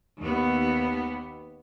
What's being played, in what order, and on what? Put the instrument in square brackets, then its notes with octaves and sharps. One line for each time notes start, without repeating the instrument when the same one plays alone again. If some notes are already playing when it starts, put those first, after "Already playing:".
[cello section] D#2 B3